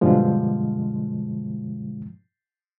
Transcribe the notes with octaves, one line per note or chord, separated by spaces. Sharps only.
G2 B2 D3 F3 G#3